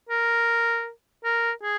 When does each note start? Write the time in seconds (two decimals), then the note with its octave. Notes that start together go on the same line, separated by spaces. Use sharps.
0.09 A#4
1.24 A#4
1.63 G#4